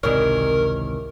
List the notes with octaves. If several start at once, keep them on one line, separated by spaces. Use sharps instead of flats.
G#1 C#2 C3 D#3 E3 A#4 C#5